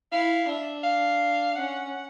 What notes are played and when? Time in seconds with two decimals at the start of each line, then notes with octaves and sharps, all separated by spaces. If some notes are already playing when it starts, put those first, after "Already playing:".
0.12 E4 F5
0.48 D4 E5
0.84 F5
1.55 C#4 F#5